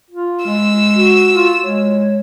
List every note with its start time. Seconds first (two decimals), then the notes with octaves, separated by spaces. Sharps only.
0.10 F4
0.45 G#3 E6
0.96 F#4
1.33 F4
1.64 G#3 C#5